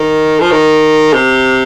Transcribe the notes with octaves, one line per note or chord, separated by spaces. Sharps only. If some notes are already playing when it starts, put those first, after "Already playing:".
Already playing: D#3
F3
D#3
C3